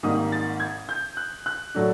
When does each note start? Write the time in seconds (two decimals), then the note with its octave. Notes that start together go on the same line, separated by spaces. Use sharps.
0.03 G#1 G#2 D#3 G3 A#3 D#6
0.32 A6
0.60 G#6
0.89 G6
1.17 F#6
1.46 F#6
1.75 A2 F#3 A3 D4